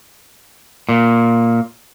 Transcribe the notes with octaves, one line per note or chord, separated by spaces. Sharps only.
A#2